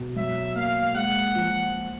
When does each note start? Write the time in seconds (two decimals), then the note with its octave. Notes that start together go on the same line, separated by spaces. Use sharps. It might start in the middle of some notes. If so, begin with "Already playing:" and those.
Already playing: B2
0.16 F#3 E5
0.56 A#3 F5
0.95 G#3 F#5
1.35 F3